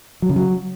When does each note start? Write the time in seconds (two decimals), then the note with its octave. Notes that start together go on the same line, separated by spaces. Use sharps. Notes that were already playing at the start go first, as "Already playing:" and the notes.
0.22 F#3
0.29 C#3
0.36 F#3